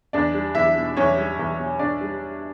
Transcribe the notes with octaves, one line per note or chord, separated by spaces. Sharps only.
E2 D4 D5
G3
E2 E4 E5
B2
E2 C#4 C#5
G3
E2
B2
E2 D4 D5
G3